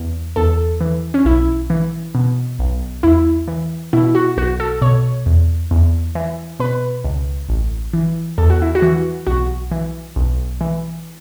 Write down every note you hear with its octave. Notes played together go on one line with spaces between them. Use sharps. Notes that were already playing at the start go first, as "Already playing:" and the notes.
Already playing: E2
E2 A4
E3
C#4
B1 E4
E3
B2
B1
E2 E4
E3
B2 E4
F#4
B1 F#4
A4
B2 C#5
E2
E2
E3
B2 B4
C#2
A1
E3
E2 A4
F#4
E4
F#4
E3
B1 F#4
E3
B1
E3